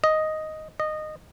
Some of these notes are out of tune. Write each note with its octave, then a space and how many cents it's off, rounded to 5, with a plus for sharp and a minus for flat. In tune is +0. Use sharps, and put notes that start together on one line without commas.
D#5 +5
D#5 -15